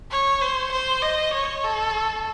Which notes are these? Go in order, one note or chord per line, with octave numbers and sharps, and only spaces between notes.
C#5
C5
C5
D#5
C#5
A4